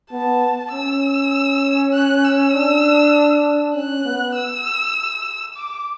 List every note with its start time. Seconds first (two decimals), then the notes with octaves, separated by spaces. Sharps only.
0.12 B3 A5
0.72 C#4 E6
1.93 F#6
2.24 E6
2.55 D4
3.75 C#4 F#6
4.05 B3
4.36 E6
5.57 D6